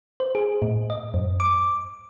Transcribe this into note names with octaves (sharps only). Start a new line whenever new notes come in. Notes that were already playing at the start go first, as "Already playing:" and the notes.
C5
G#4
A2
D#5
F#2
D6